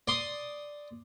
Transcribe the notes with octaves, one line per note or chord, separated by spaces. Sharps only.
D5 C6 D#6